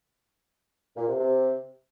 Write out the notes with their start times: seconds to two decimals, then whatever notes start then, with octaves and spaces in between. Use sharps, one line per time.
0.96 A#2
1.07 C3
1.18 C3